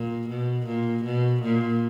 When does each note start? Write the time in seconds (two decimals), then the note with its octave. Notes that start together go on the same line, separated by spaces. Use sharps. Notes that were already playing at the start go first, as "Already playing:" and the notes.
Already playing: A#2
0.29 B2
0.67 A#2
1.05 B2
1.43 A#2